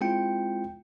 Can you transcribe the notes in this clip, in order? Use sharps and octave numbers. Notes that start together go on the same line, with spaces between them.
G#3 C4 E4 F4 G5 C#7